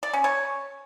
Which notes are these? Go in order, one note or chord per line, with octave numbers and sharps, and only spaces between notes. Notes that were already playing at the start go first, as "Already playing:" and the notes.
D5
C#4
C#5